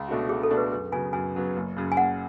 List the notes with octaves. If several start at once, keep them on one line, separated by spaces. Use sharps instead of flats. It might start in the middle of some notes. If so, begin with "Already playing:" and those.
Already playing: C#2
B2 A3 D4 F#4
C#2 G#4
A4
B2 A3 D4 F#4
B4
F#2 B4
C#3 F#3 B3 G#5
F#2 G#5
C#3 F#3 B3
F#1
F#2 C#3
G#5
F#1 F#5